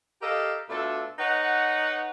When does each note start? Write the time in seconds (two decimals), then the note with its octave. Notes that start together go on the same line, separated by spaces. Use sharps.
0.21 G4 A4 A#4 D#5 F5
0.69 B2 A3 D4 F4 A4
1.18 D#4 B4 C#5 F#5